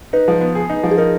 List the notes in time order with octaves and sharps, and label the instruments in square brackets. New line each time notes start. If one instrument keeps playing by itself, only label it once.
[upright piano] D#4 [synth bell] B4
[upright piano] F3
B3
G#4
D#4
F3
[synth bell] G#4
[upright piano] D#4 [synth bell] A#4